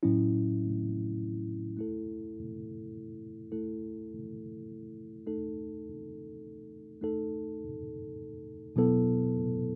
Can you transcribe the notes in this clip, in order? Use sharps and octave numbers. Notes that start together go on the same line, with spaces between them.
A2 F#3 C#4 E4
A3 E4 A4
A3 E4 A4
A3 D#4 A4
A3 D#4 A4
B2 F#3 B3 E4 A4